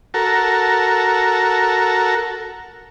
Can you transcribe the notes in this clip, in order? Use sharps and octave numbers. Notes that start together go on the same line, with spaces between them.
F#4 A4 A#4